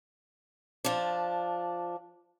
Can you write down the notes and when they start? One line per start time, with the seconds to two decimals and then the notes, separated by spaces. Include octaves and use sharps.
0.84 F3 D4